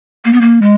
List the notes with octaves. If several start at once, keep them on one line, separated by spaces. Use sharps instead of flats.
A#3
B3
A#3
G#3